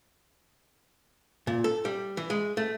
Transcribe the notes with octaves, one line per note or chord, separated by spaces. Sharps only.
A#2
A4
G3
E3
G#3
A3